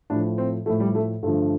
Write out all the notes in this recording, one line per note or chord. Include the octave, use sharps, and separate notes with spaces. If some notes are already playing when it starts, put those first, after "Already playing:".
A2 F3 D4
C4
A2 F3 A3
G3
A3
G2 D3 F3 A3